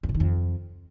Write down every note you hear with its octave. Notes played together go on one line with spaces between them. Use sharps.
E2
B2
D#3
F2